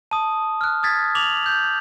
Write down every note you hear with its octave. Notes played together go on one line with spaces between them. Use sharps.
A5 D#6
F6 F#6
D#6 G#6 A6 B6
D6 F7 F#7
G6